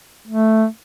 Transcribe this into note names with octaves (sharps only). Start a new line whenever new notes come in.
A3